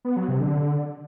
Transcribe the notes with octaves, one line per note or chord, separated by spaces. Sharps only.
B3
F#3
C3
D3